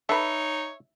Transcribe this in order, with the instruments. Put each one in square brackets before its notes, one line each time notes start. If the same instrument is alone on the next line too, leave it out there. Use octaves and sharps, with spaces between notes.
[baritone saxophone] D#4 [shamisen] A4 B4 [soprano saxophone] C#5 [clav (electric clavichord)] E5